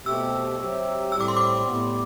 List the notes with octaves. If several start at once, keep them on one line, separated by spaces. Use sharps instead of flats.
B2 A3 C4 G4 E6
C3 F#3 C4 G4
A2 G3 C4 E6
D6
C6
D6
A2 G3 B3